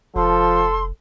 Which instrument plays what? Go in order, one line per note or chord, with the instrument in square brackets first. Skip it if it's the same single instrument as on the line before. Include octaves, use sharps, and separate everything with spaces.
[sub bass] F1 [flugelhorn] F3 [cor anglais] A4 [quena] C6